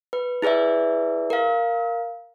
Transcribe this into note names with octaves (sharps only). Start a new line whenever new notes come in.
B4
E4 G#4 B4 D5 E5
A#4 F5